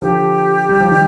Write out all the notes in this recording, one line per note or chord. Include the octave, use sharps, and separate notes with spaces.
D3 F3 G4
G3
F3
D#3 G3